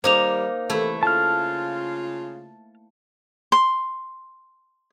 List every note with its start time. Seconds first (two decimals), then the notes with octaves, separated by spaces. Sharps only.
0.04 D#3 G3 A#3 D#4 C5 D6 F7
0.70 C3 E3 A3 E4
1.03 C#3 F4 A5 F6
3.52 C6